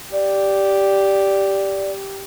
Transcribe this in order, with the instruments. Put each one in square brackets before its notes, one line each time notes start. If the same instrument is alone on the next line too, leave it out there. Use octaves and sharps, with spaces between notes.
[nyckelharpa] G4 [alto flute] D5